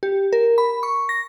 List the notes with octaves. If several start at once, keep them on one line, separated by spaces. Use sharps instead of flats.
G4
A#4
B5
C#6
A#6